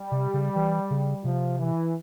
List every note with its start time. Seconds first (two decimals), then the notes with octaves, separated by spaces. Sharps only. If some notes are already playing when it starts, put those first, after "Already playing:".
Already playing: G3
0.12 C3
0.34 C#3
0.56 E3
0.91 C#3
1.24 C3 F3
1.58 E3